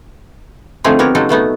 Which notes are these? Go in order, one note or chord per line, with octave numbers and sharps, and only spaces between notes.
D3 F3 A3 C4 D#4 G#4
B3 C4 G4 A#4 C#5
C#3 F#3 G#3 D#4 A4
B2 A3 B3 D#4